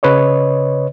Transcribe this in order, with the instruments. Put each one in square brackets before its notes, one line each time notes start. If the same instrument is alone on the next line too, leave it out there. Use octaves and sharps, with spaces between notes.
[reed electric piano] C#3 B4 C#5 D#5